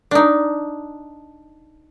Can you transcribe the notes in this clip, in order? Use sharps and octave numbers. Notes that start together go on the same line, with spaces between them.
D4 D#4